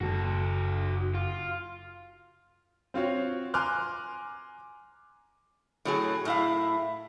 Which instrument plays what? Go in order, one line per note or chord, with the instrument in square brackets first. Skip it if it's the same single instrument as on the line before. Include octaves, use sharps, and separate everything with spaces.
[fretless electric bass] F#1 [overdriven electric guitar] F#4 A4
[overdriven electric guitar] F4
[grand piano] C4 F4 F#4 C#5
G#5 A#5 C6 D6 F6 F#6
[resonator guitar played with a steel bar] A2 F#3 G#4
A2 E4 F5